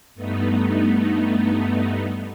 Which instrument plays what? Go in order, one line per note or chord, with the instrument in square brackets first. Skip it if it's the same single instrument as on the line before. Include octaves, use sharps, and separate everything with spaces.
[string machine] G2 A3 B3 D#4